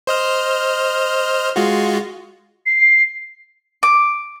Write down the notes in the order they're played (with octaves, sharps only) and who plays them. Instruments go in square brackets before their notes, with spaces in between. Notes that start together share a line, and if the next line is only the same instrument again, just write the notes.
[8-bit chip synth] C5 D#5 F6
G#3 F4 F#4
[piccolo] C7
[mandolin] D6